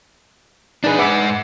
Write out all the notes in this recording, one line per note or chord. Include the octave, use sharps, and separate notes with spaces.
D4 D#4 G#4 B4
G#2 B4 E5 F#5 D6